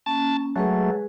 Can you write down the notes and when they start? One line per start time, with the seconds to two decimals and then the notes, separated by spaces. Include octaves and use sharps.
0.06 A#3 C#4 A5
0.56 F#3 G#3 A3 G#4 B4